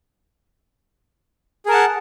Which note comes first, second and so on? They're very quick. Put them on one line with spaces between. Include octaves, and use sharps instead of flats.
G#4 A#4 A5 F#5